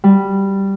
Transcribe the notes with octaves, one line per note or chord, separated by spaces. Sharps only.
G3